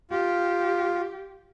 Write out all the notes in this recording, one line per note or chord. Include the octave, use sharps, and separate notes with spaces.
F4 G4